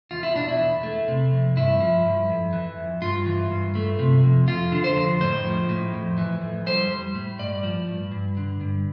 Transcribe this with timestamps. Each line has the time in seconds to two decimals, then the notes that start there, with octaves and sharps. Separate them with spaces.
0.11 E2 F4
0.23 E4
0.35 B2 D4
0.48 E4
0.59 E2
0.83 A3
1.08 C3
1.32 F2
1.56 G2 E4
1.81 F3
2.05 G2
2.29 F2
2.53 E3
2.78 F2
3.02 G2 F4
3.26 E3
3.51 G2
3.75 A3
3.99 C3
4.24 F2
4.47 F2 F4
4.72 D3
4.84 C5
4.97 F2
5.21 A2 C5
5.45 F3
5.69 A2
5.93 F2
6.18 E3
6.41 F2
6.66 G3 C5
6.90 G3
7.15 A2
7.39 G2 D5
7.63 F3
7.88 G2
8.12 G2
8.37 D3
8.61 G2